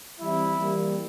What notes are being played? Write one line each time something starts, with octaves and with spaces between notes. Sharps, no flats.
E3 G3 C4 E4
E3 G3 A#3